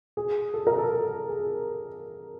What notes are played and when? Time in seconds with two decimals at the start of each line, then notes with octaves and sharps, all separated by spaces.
0.17 G#4
0.54 A4
0.67 A#4
0.78 A4
0.92 A4
1.29 G#4